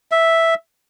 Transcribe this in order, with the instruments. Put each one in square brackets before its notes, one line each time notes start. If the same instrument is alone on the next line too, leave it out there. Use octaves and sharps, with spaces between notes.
[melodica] E5